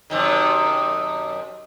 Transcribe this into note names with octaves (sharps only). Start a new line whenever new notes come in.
F#2 C3 D#3